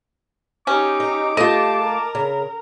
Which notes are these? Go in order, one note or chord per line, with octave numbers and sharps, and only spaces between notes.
C#4 D#4 G4 D6
D#5
A3 F4 G4 D#5 A5
A#4
C#3